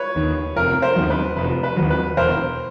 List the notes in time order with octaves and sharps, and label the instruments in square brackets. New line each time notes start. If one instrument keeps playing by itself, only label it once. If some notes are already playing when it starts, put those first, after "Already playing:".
Already playing: [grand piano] B4 C#5
[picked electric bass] D#2 D#3
[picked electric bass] F1 [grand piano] A#4
[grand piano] A#4 C5
[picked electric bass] D#2 D#3 F#3
[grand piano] B4
[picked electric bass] F1 [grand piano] B4
[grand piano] B4
[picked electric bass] D#2 D#3 F#3
[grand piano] B4
[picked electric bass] E1 [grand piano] A#4 C5